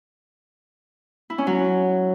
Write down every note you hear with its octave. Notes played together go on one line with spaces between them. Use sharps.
E4
C#4
F#3